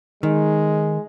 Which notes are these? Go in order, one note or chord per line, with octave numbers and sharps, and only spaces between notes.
D#3 G#3